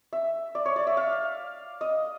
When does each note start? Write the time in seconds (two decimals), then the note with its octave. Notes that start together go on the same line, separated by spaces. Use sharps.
0.13 E5
0.55 D5
0.66 C#5
0.76 D5
0.87 E5
0.97 F5
1.81 D#5